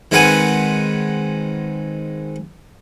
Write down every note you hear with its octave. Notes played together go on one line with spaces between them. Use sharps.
D#3 G#3 C4 B4 F#5 G#5